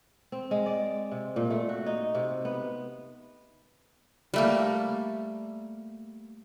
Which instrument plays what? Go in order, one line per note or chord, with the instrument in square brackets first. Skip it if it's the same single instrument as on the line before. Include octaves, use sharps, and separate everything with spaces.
[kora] C4
G#3
D5
C3
A#2
A3
F#4
D#4
C3
B3
[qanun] G3 A3 A#3